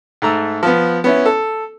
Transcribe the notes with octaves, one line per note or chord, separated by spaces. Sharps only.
G#2 A3 A#5 E6
F3 B3
B3 C#4 E4
A4